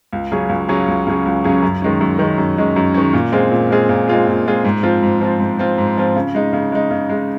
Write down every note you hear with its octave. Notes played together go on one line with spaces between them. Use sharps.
C#2
C#3 F#3 C#4 G#4
C#2
C#3 F#3 C#4 G#4
C#2
C#3 F#3 C#4 G#4
C#2
C#3 F#3 C#4 G#4
F#2
D#3 G#3 C#4
F#2
D#3 G#3 C#4
F#2
D#3 G#3 C#4
F#2
D#3 G#3 C#4
A#2
G#3 C4 F4 G#4
A#2
G#3 C4 F4 G#4
A#2
G#3 C4 F4 G#4
A#2
G#3 C4 F4 G#4
G#2
F3 C4 F4
G#2
F3 C4 F4
G#2
F3 C4 F4
G#2
F3 C4 F4
C#3
G#3 D#4
C#3
G#3 D#4
C#3
G#3 D#4